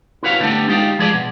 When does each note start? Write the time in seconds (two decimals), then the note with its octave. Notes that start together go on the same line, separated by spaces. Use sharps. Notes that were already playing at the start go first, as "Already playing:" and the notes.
0.23 E4 F#4 B4 C#5 F5
0.40 D3 G3 A3 B3 D4
0.69 G#3 D#4 F4 G4
0.99 F3 G#3 G#4 B4 D5
1.13 B2